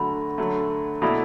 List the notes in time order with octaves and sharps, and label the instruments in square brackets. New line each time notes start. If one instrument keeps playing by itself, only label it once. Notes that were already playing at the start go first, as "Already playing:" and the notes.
Already playing: [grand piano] D3 F#3 A3 F#4 [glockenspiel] B5
[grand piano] D3 F#3 A3
[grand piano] B2 A3 E4 D5 [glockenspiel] B5